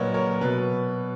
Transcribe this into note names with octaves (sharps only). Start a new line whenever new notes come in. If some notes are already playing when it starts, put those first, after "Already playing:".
Already playing: A#2 F#3 A#4 B4 C#5 D#5 F#5
A#4 C#5
A#4
B2 F#3 B4